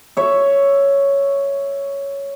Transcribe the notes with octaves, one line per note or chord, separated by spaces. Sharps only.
C#5 E5